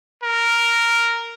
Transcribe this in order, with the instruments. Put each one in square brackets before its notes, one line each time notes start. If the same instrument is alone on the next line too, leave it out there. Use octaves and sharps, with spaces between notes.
[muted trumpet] A#4